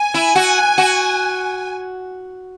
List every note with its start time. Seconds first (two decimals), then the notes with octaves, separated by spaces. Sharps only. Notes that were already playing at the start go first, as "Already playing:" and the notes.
Already playing: G#5
0.14 E4
0.36 F#4
0.78 F#4